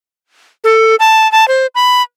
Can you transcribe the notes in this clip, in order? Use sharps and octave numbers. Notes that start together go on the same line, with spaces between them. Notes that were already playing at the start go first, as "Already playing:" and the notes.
A4
A5
A5
C5
B5